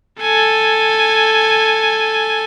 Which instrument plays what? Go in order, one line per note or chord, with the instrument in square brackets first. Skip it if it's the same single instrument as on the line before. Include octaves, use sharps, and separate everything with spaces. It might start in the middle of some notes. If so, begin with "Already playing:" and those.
[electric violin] A4 G#5